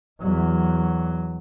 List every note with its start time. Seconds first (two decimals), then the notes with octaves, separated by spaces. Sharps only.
0.21 E2 F#3